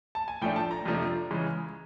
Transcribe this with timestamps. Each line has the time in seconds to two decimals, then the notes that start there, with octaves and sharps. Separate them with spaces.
0.15 A5
0.28 G#5
0.41 A2 F3 A3 D4 G5
0.56 A5
0.71 A#5
0.86 F2 C3 F3 A3 D4
1.30 C#3 E3 G#3